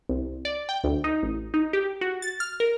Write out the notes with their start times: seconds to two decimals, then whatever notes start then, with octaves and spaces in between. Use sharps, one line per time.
0.09 C2
0.45 D5
0.69 G5
0.84 D2
1.04 D#4
1.23 A1
1.54 D#4
1.73 G4
2.01 F#4
2.22 A6
2.40 F6
2.60 A#4